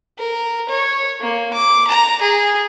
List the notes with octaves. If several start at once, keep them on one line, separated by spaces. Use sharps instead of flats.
A#4
C#5
A#3
D6
A#5
G#4